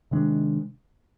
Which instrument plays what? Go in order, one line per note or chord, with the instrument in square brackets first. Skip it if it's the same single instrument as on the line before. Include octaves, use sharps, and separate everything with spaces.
[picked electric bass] C3 D#3 G#3 D4